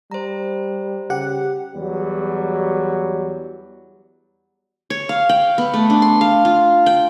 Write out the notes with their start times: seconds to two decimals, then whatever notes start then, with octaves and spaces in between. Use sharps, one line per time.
0.11 G3 C5 A#5
1.10 C#3 G4 F#5
1.76 E2 F#3 G3
4.90 C#5
5.09 F5
5.29 G5
5.58 B3
5.74 A3
5.90 D4
6.02 C6
6.21 F5
6.45 F4
6.86 G5